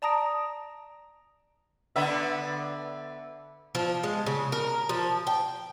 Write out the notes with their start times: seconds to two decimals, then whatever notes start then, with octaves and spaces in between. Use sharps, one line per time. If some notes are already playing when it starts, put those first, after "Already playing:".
0.02 D5 A5 A#5 D#6 A#6 D7
1.96 D3 B3 E5
3.75 F3
4.03 G#3
4.26 C#3
4.52 A#4
4.89 F3
5.27 G5